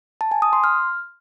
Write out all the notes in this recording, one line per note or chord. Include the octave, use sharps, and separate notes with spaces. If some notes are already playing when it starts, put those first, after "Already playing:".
A5
G#5
D#6
C6
F6